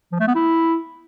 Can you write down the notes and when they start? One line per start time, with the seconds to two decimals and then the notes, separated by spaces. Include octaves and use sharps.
0.12 F3
0.20 A3
0.27 B3
0.35 E4